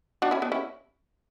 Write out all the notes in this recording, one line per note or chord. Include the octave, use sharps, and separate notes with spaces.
D4 F#4
C#4 E4
B3 D4
C#4 E4